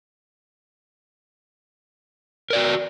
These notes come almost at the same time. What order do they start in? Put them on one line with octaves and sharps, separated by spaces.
A#4 D5 F#4